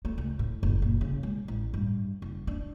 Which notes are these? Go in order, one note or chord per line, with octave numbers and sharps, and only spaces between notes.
A3
C#2
A2
F#1
A#2
C#3
G#3
A1
G2
F#1
D4